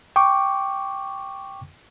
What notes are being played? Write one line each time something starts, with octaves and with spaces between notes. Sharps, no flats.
G5 C#6 D6